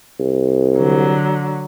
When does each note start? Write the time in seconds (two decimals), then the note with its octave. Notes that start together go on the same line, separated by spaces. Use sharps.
0.20 C2
0.77 D3 F#3